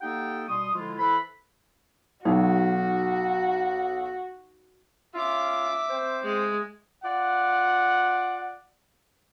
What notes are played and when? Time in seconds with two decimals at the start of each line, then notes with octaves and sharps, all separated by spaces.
0.01 A#3 D#4 G4 A4 F#5 G5
0.48 B2 G3 C6 C#6 D#6
0.74 D3 F3 G#3 E4 F4
0.99 E3 E4 A4 B4 C5 B5
2.25 B1 D#4 F#4
5.15 C#4 F4 E5 D6
5.89 C4 C5
6.23 G#3
7.04 F4 D5 F#5